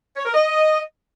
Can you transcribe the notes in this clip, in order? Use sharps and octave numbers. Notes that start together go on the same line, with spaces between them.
C#5
A#4
D#5